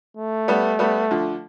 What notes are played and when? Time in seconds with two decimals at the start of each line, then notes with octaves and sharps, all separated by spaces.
0.17 A3
0.48 G3 B3
0.79 G3 B3
1.11 D3 F3